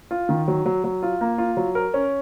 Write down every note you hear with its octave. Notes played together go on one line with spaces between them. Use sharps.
F4
D#3
F#3
F#3
F#3
F4
A#3
F4
F#3
A#4
C#4